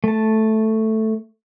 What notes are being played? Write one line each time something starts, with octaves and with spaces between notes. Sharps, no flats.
A3 A5